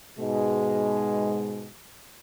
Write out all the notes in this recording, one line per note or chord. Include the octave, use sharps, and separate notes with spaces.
G#2 B2 G#3